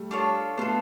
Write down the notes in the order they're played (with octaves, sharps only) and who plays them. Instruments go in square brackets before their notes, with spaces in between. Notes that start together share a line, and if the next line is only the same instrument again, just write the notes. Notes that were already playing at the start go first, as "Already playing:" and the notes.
Already playing: [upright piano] G3 A3
[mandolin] D4 F4 A4 C#5
[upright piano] A3 B3 [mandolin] D4 F4 A4